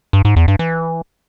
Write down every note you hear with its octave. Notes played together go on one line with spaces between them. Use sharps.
G2
G#2
E2
G2
E3